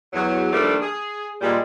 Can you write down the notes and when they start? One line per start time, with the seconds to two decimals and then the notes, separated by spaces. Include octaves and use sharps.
0.13 E2 F#3
0.52 D#3 F3 G3 A3 A#3 D4
0.81 G#4
1.41 A#2 G3 G#3